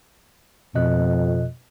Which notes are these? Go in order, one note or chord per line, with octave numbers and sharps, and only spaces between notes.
F2 B2 D#5 F#6